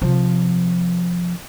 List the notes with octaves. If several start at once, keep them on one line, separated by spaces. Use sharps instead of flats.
C3 F3